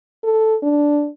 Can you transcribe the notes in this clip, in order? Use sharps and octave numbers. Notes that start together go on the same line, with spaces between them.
A4
D4